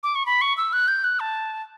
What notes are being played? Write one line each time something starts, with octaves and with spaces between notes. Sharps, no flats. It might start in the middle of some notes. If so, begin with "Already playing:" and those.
D6
C#6
B5
C#6
E6
F#6
G6
F#6
A5